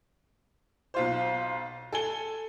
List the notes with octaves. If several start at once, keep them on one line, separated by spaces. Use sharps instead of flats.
B1 F4 C5
A4 G#5 G7